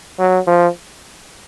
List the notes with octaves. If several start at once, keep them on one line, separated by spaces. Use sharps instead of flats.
F#3
F3